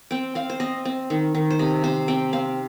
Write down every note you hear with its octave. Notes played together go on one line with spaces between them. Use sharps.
C4 G5
C4 F5
C5
C4 D#5
C4
D#3
D#3
C5
C3 D#5
C3 C5
C4 G5
C4 F5